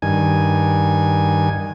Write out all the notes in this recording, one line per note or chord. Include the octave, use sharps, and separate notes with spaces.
G2 D#3 G#5